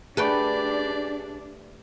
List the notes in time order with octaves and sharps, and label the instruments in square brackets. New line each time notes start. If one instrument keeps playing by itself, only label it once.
[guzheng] A3 B4 G5 [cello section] D4 [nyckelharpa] G4 D5 [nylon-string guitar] G#4